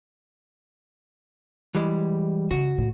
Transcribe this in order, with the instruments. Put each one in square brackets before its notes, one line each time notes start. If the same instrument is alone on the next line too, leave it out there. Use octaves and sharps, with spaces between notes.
[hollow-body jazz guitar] E3 G3 G#3
[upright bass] C#3 [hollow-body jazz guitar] F#4
[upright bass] A2